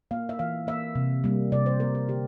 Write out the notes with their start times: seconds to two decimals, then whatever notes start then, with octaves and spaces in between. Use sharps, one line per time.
0.11 A#3 F5
0.29 E5
0.39 E3 F5
0.67 A#3 E5
0.95 C3
1.24 G3 A#3
1.52 C3 D5
1.66 C5
1.80 G3 A#3 A#4
1.95 A#4
2.08 D3 G4